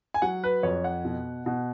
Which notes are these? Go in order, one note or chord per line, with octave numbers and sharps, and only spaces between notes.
G#5
F#3 F#5
B4
F2 C#5
F#5
B2
B2